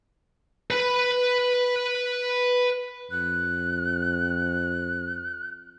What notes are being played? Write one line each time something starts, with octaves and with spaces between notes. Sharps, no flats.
B4 B5
F2 F#6